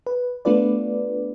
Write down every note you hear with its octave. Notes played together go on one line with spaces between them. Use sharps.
B4
A3 B3 D4 F4 B4 D5